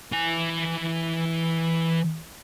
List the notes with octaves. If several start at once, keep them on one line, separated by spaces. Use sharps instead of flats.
E3 G#5